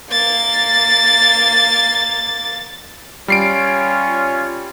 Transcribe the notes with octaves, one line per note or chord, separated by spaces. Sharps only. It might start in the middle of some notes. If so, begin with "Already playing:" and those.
A#3 A6
G3 C#4 F4 C#5 C7 D7